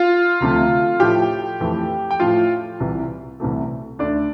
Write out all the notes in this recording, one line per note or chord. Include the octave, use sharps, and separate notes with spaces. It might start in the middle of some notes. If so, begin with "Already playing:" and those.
Already playing: F4 F5
D2 C3 F3 A3
A2 F3 A3 G4 G5
F2 E3 A3
G5
A2 F3 A3 F4 F5
C2 C3 E3
C2 C3 E3 A3
D2 D3 A3 D4 D5